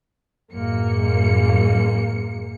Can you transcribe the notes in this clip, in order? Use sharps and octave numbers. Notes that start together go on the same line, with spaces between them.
A1 F#2 G#3 A#3 C#7